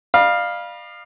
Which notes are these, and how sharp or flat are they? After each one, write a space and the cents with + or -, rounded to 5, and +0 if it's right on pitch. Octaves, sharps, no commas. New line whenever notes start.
D5 +45 F5 +0 B5 -30